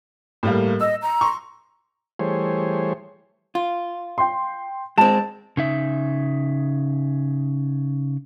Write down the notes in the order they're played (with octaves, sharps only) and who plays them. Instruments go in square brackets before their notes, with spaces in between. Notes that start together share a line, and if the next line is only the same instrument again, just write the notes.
[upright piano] A2 G3 A#3
[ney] D#5 [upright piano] E6
[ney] A#5
[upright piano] C6 C#6
[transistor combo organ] E3 G3 A3 G#4 C5 C#5
[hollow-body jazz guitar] F4
[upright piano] G5 C6
[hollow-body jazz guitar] G#3 C4 [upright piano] A5 E7
[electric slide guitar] C#3 D#4 E5